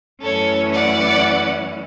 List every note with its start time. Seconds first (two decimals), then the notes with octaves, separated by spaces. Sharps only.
0.23 F#2 E3 A3 C#4 A4 C#5
0.74 D5 F#5